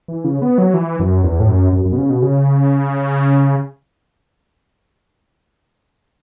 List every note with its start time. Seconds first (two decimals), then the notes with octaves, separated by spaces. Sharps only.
0.08 E3
0.24 C#3
0.42 B3
0.58 F#3
0.74 E3
0.99 F#2
1.24 E2
1.40 A2
1.48 F#2
1.73 F#2
1.85 F#2
1.92 B2
1.98 C#3
2.10 B2
2.22 C#3